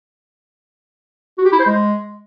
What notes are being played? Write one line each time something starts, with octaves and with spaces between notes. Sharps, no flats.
F#4
G4
E4
C5
G#3